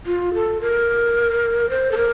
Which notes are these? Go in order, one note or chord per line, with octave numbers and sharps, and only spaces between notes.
F4
A4
A#4
C5
A4
A#4